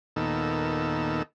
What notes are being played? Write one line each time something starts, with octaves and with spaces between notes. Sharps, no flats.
D#2 A#2 D#3 B3 A4 E6